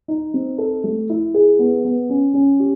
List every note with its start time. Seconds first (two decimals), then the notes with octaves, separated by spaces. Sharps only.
0.08 D#4
0.34 C4
0.58 A4
0.84 A3
1.10 E4
1.34 G#4
1.59 B3
1.85 B3
2.10 C#4
2.34 C#4
2.60 G4